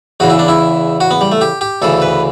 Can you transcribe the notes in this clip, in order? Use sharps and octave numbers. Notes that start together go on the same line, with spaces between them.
E2 C#3 E3 F#4
E4
D4
E4
F#4
B3
G3
A3
G4
G4
D2 C#3 E3 A4
B4